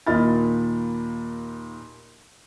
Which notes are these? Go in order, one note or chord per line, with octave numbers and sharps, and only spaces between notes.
D#2 A#2 D#5 B5 F6 A6